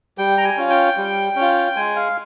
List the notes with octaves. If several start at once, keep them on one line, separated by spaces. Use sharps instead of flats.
G3 G5
A#5
G#5
C#4 F4
G5
G3
C#4
F4
G#3 G#5
F5